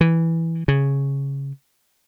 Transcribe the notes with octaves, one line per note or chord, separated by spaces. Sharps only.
E3
C#3